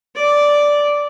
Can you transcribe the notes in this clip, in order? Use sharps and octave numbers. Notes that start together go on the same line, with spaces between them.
D5